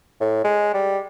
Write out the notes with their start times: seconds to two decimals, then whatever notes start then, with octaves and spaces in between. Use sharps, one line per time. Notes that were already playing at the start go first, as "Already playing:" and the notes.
0.21 A2
0.44 G#3
0.74 G3